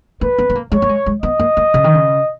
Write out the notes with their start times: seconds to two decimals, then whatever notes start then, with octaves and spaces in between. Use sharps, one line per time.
0.21 A#3 B4
0.38 B3
0.50 B3
0.55 A#3
0.72 G#3 C#5
0.82 A#3
0.89 G#3
1.06 G#3
1.23 B3 D#5
1.39 A#3
1.57 A#3
1.74 C#3
1.84 D#3
1.94 C#3